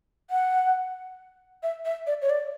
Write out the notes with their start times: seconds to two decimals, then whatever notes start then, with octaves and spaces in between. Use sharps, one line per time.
0.30 F#5
1.63 E5
1.85 E5
2.07 D5
2.22 C#5
2.30 D5